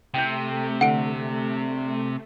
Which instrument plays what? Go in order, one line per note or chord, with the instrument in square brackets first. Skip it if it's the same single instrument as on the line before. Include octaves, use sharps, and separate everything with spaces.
[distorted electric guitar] C3 [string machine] A3 [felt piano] G5 G6
[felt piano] D3 [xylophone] F#5 D7